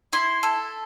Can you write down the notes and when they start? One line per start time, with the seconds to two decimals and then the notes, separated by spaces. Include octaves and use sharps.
0.13 E4 C6
0.43 A4